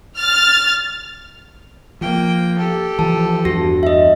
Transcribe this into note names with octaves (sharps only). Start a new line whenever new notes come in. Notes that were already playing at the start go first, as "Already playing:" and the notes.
F6 A6
F3 A#3 G5
G4 A4
E3 F3 A5
E2 G2 F#4 A#6
D#5 E5